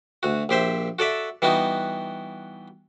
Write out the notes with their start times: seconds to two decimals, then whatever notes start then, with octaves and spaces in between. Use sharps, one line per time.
0.23 D2 F#4
0.49 A#1 G4 C5 E5
0.99 F#4 A4 D5 E5
1.42 E3 G3 B3 D#4 F#4